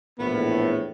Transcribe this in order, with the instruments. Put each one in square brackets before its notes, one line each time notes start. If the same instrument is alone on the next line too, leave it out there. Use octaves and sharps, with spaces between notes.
[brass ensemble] A#1 E2 A2 [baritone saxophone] B3